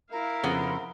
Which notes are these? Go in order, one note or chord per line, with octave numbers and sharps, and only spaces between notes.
E4 A#4 F5
F2 C#3 B3 C5